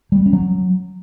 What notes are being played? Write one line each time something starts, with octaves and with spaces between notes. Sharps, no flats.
G3
B3
C#4
F#3